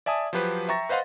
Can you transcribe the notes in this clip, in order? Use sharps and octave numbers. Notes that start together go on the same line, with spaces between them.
D5 E5 G#5 A5 D#6
F3 F#3 G4 B4 C5
E5 G5 A#5 C#6 A6 A#6
B4 C5 D#5 F5 F#5 C6